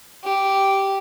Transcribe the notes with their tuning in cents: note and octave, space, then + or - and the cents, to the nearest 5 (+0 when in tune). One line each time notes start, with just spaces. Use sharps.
G4 -5